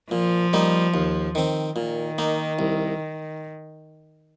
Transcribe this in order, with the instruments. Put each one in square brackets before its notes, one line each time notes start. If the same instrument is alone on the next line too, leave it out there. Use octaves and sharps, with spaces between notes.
[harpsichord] A#2 [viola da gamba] F3
[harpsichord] G3 A#3 D#4
D#2
D#3 C4
[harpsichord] A#2 [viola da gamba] D#3
[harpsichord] A#3 D#4
C2